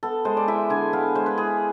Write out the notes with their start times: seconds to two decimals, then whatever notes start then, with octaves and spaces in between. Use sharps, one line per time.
0.03 B3 A4
0.25 G#3 C5
0.37 D5
0.48 E4 E5
0.70 D3 G#5
0.93 B3 F5
1.15 G#3 C5
1.26 B4
1.38 E4 G#4